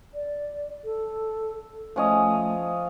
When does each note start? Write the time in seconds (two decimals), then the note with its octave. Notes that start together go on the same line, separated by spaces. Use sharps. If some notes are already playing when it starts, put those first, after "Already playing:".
0.14 D5
0.84 A4
1.96 F3 A3 C#4 D#5